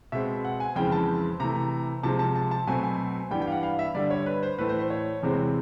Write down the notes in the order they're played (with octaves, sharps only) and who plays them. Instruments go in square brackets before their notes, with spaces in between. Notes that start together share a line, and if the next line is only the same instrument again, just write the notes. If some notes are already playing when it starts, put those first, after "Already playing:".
[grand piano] B2 G#3 C4 E5
F#5
G#5
F2 C#3 E3 G#3 C4 G5
A5
C3 E3 A3 A#5
C3 F3 G#3 C4 A5
A5
A5
A5
B2 F#3 A3 C4 G#5
G#5
G2 E3 G3 B3 G5
G5
F5
F#5
F5
E5
G2 D3 G3 D5
C#5
B4
C5
A2 E3 A3 B4
C5
C5
C#5
E2 C3 E3 G#3 C4